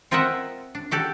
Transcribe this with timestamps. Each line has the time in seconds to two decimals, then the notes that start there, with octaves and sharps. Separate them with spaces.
0.11 C4 F4 A#4 D#5 E5 F#5
0.75 D4
0.91 F#4 G4 A4 D5